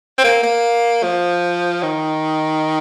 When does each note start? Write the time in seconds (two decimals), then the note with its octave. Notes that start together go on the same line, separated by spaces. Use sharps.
0.18 C4
0.24 A#3
0.43 A#3
1.03 F3
1.83 D#3